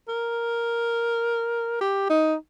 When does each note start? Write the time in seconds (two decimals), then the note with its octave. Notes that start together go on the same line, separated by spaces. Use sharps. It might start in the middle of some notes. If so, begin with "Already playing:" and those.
0.08 A#4
1.81 G4
2.10 D#4